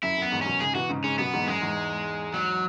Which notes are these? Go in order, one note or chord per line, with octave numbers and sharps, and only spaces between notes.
F#2 E4
F#2 B3
E2 G#2
F#2 B2 C#4
G#2 C#3 G#4
B2 E3 F#4
G#2 C#3
G#2 C#3 C#4
F#2 B2 B3
E2 G#2
F#2 G#3
E2 G#2
F#3